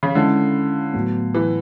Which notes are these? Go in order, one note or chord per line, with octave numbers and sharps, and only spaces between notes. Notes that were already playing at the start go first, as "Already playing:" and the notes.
C#3
D3 G#3 C#4 E4 A4
A2 F#3 B3
E3